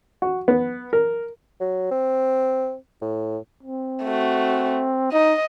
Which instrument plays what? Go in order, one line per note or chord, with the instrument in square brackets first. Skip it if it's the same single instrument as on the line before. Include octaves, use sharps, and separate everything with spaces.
[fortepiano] F#4
B3
A#4
[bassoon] F#3
C4
A2
[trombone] C4
[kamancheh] A3 F#4
[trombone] D#4 [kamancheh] D#5